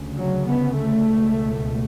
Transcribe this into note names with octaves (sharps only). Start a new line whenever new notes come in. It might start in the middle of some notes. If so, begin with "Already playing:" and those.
Already playing: D2 C#3
F#3
B3
A3
C#2 B2